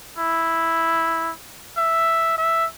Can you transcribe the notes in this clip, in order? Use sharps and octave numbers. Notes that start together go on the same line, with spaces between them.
E4
E5
E5